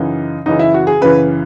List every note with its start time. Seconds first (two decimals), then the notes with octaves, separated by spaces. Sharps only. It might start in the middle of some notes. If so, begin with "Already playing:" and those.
Already playing: F#2 C#3 E3 D#4
0.46 F#2 C#3 E3 D#4
0.59 E4
0.74 F#4
0.87 G#4
1.01 F#2 C#3 E3 B4